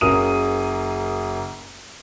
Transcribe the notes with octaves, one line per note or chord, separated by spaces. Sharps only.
F#1 C#3 A#4 D#6 D#7